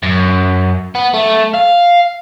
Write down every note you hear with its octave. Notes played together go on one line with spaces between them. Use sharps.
F#2
B3
A3
F5